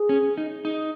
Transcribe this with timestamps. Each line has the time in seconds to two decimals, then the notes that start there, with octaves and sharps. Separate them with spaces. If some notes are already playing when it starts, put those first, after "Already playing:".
Already playing: G#4
0.09 C#4
0.37 D#4
0.65 D#4